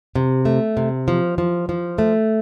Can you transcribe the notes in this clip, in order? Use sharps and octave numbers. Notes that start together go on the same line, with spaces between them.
C3
A3
C3
F3
F3
F3
A3